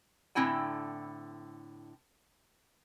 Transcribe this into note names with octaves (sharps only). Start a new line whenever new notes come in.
A2 D3 C4 E4 G5 G#5